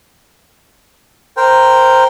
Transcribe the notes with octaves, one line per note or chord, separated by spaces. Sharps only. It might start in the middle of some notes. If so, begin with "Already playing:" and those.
A#4 C5 G5